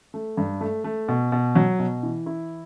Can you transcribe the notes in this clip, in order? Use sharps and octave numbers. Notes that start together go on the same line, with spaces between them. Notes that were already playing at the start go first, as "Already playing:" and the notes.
A3
G2
A3
A3
B2
B2
F#3
B2
E3
E4